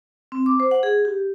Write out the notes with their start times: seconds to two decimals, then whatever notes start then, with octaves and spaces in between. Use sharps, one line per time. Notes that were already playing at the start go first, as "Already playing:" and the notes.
0.32 C4
0.46 D6
0.60 C5
0.71 F#5
0.83 G#4
1.05 G4